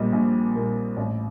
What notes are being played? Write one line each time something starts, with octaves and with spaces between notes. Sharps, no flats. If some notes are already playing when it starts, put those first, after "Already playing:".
Already playing: A#1 A#2 G3 A#3 D#5
A#1
A#2 G3 A#3
A1 D5